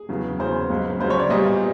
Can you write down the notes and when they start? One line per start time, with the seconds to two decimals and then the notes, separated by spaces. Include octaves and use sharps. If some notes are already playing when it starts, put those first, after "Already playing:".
Already playing: G#4
0.09 E2 C#3 F#3 B3
0.39 E2 C#3 F#3 B3 C5
0.70 C#2 C#3 F#3
0.99 C#2 C#3 F#3 C5
1.10 C#5
1.19 D5
1.30 A#2 G3 B3 D#5